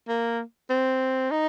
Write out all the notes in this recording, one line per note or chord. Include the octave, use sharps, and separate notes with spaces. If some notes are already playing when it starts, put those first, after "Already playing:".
A#3
C4
D#4